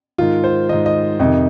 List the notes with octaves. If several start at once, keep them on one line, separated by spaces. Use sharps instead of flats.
G#2 D#3 F4
C5
G#2 D#3 D#5
D#5
F2 C3 D#3 D#4